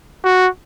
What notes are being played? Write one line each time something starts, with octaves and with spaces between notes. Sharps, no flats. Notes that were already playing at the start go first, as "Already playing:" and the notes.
F#4